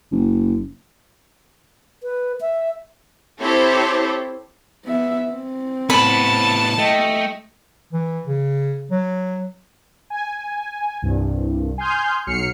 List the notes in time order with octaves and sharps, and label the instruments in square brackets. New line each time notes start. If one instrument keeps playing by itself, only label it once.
[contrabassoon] F#1
[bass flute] B4
E5
[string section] C4 E4 G4 A4 C5 C#5
[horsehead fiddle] B3 E5
C4
[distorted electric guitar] A2 B3 [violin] A5 [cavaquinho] B5
[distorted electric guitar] A3 [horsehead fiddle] D#5 G5
[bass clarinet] E3
C#3
F#3
[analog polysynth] G#5
C2 G2
G#5 C6 D#6 F6 G6
B1 F#3 F6 C7 C#7